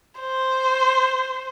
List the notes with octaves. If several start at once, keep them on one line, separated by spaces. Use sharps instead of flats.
C5